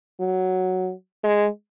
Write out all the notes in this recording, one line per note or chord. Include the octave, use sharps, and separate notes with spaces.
F#3
G#3